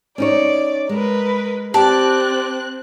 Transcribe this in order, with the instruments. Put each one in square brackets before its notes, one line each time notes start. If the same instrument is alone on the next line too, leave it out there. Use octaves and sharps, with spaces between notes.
[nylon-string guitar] C#4 D#4 C#5 [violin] D5
[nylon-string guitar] G#3 [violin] A#4 B4
[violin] C4 F#6 [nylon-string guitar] G4 [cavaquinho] D5 A5